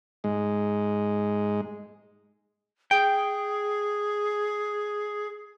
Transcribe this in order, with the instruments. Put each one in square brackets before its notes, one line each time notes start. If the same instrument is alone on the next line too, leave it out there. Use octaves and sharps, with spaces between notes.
[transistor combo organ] G#2 G#3
[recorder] G#4 [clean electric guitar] G5